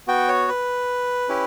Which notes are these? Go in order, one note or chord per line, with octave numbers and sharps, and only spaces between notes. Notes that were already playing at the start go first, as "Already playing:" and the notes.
B3 F#4 G5
C#5
B4
C#4 E4 G4